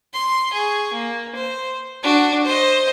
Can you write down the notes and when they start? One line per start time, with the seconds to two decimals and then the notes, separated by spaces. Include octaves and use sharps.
0.14 C6
0.53 G#4 C#6
0.93 A#3
1.35 C5
2.03 D4 F#4
2.45 C5 D#5